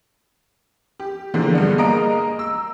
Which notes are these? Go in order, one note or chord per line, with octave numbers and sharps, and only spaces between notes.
G4
D3 E3 F3 G#3 A#3
G2 G#3 B3 D4
G#3 A#3 D#5 A#5 D7
E6